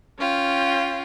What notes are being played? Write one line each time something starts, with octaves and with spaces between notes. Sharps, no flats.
C#4 F4 G5